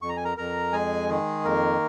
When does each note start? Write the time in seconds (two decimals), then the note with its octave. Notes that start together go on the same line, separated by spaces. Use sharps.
0.02 F2 C#6
0.09 A#5
0.17 G#5
0.24 A#4 A#5
0.37 F2 A#4 A#5
0.73 G#3 G#4 G#5
1.09 D#3 G#4
1.44 F2 A#3 A#4